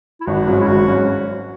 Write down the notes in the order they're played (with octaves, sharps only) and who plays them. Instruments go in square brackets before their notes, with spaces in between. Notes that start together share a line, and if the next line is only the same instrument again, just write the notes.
[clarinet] E4
[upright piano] G#1 [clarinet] F#4
[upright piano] G#2 F#3 C#4
[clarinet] E4
[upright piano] G#1 [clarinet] F#4
[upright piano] G#2 F#3 C#4